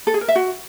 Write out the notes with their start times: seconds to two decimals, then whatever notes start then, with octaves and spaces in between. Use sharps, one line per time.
0.07 A4
0.14 G#4
0.21 A#4
0.28 E5
0.35 F#4